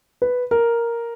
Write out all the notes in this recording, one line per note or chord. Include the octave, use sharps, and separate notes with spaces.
B4
A#4